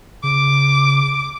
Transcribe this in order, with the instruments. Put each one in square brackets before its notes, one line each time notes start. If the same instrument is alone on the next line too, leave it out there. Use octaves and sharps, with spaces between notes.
[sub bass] C#3 [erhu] D6